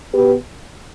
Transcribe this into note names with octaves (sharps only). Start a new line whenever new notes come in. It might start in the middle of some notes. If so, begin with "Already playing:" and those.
B2 B3 G4 B4